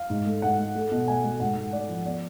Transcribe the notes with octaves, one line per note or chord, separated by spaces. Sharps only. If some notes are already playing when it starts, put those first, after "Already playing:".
Already playing: F5
G#2
A3
G#2 F#5
A3
A3
B2
A3 G#5
A3
G#2 F#5
G#2
A3 D5
F3
B3 D5